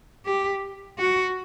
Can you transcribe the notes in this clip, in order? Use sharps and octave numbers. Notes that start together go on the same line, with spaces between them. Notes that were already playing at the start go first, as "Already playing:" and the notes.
G4
F#4